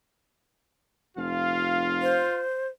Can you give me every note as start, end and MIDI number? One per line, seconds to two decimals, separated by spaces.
1.17 2.29 29
1.17 2.45 65
1.17 2.29 77
2.02 2.68 72